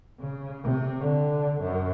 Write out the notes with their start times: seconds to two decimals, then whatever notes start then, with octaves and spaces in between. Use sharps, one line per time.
0.20 C#3
0.64 C3
1.01 D3
1.61 F#2